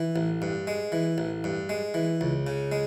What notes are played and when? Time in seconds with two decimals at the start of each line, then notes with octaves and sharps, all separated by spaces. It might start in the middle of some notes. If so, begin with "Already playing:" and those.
Already playing: E3
0.16 A1
0.42 G2
0.67 G#3
0.92 E3
1.18 A1
1.44 G2
1.69 G#3
1.94 E3
2.21 C#2
2.47 C#3
2.72 G#3